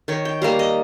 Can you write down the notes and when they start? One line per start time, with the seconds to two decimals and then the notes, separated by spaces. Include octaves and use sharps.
0.08 D#3 C#5
0.25 G5
0.42 G3 A#3 F5
0.59 D#5